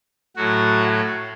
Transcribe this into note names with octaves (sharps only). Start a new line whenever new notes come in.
A2 F#3 F#4